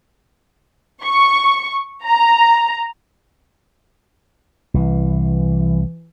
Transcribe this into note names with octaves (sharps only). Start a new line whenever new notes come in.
C#6
A#5
C2 E3